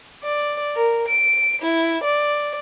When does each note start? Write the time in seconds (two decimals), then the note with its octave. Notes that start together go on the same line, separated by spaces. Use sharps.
0.23 D5
0.76 A#4
1.08 D7
1.62 E4
2.04 D5